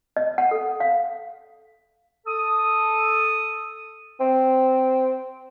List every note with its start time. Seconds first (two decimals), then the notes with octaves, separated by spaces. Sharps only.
0.17 D#5
0.38 F#5
0.51 A4
0.80 F5
2.26 A4 D#6
4.20 C4